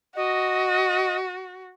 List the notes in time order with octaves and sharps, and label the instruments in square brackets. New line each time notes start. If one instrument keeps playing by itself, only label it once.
[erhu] F#4 [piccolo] D#5